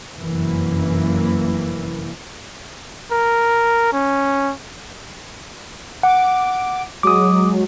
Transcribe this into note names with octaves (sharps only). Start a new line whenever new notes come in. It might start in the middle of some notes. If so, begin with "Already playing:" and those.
F1 F#2 E3 A#3
A#4
C#4
F#5 D6
F#3 G#3 D6 D#6